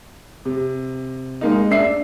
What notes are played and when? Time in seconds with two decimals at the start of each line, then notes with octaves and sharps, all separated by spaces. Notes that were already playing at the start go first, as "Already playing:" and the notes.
0.45 C3
1.41 G#3 A#3 D#4
1.71 D4 E5 C7